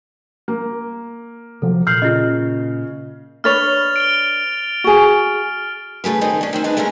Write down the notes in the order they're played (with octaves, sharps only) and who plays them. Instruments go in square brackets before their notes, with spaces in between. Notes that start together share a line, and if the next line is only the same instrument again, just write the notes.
[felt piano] A#3
[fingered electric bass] C3 F3 F#3 [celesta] A4
[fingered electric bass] A#2 [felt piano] F6 [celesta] G6 C7 F#7
[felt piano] C#3 [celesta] F4 D#5
[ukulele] D4 B4 C#5 [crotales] F6 A6 F7
[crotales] D7 G7
[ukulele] F#4 G#4
[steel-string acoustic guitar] C#3 A3 G#4 B4
D#3 C4 D#4 G#4
C#4 D4
D#3 C4 C#4
D4 D#4 G#4 B4 C5
G#3 A3 C#4 E4 A#4